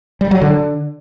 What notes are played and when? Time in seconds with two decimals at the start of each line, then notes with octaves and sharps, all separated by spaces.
0.21 G3
0.31 F#3
0.41 D3